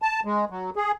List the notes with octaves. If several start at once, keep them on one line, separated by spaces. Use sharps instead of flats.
A5
G#3
F#3
G#4